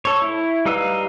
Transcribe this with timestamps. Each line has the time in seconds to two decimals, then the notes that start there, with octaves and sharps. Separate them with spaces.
0.05 A4 C#5
0.22 E4
0.66 G3 D#4 B4 F5 E6